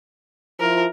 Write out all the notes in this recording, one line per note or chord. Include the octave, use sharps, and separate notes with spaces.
F3 E4 A#4